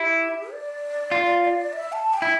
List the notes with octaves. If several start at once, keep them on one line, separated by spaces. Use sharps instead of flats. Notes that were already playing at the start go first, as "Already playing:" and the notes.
Already playing: E4 G4
D5
F4
E5
A5
G5
E4